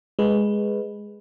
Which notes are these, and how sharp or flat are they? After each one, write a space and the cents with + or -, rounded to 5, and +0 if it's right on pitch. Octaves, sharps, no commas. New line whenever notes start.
G#3 +0 B4 +0